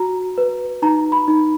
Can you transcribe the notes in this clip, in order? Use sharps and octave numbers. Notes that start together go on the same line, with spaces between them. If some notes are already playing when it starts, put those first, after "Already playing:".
Already playing: F#4 A#5
B4
D#4 A#5
B5
D#4